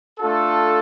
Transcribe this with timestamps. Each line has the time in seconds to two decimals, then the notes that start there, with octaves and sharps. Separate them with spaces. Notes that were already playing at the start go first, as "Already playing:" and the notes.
0.20 A3 D4 F4 A4